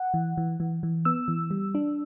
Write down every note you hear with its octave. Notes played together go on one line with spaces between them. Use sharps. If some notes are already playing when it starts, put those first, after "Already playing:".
Already playing: F#5
E3
E3
E3
E3
B3 E6
E3
G3
D4